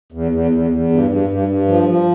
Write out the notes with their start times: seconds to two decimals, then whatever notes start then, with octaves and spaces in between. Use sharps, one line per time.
0.12 E2
0.32 E2
0.51 E2
0.71 E2
0.90 G2
1.10 G2
1.29 G2
1.48 G2
1.68 F3
1.89 F3